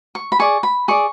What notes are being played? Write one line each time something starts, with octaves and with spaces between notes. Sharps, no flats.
C#6
B5
G#4 D5 C#6
B5
G#4 D5 C#6